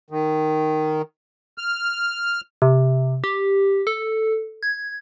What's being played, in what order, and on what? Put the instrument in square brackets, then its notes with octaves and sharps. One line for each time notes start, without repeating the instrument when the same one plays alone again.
[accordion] D#3
F6
[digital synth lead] C3
G4
A4
G#6